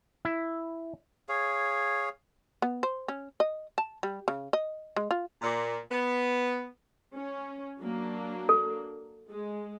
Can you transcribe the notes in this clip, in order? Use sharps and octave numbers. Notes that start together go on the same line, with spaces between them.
E4
G#4 C#5 F5
B3
C5
C#4
D#5
A5
G3
C#3
D#5
G#3
F4
A#2
B3
C#4
F#3 A#3 D4
A4
G#3